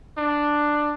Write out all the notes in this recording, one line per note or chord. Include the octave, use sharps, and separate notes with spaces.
D4